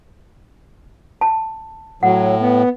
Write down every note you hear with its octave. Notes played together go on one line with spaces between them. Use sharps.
A5
A2 F#3 F#5
B3